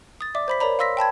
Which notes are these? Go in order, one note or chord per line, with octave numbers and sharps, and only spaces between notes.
D#6 A6
D5 E5 D6
C5 B5 B6
A#4 C#5 D5 A#5 B5
F5 C6 E6 A#6 B6
G5 A5 B5 G#6